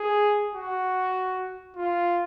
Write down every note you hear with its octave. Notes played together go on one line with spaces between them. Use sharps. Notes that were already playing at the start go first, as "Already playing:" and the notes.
Already playing: G#4
F#4
F4